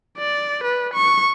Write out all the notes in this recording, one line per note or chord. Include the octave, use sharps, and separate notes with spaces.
D5
B4
C#6